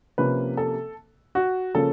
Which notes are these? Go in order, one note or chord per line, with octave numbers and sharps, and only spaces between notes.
C3 F3 A#3 C#4 B4
A4
F#4
C#3 F3 A#3 C#4 A4